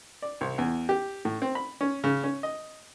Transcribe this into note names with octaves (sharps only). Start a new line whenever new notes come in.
D5
C2
E2
G4
A2
C4
B5
C#4
C#3
C#4
D#5